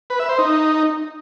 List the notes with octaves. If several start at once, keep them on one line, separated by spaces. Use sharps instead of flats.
B4
E5
C5
D#4